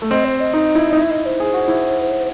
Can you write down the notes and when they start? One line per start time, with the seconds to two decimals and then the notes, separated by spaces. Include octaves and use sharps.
0.02 A3
0.11 C4 D#5
0.25 C5
0.40 D#5
0.53 D#4
0.75 E4
0.93 D#4
0.97 E4 E5
1.11 D#5
1.26 C5
1.40 G#4
1.54 F#4
1.68 E4